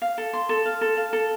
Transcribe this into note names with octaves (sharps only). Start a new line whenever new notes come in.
F5
A4
C6
A4
F5
A4
F5
A4